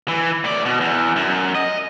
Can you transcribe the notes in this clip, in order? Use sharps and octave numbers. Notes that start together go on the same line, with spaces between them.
E3
A2 D5
B2
E2
F#2
D#5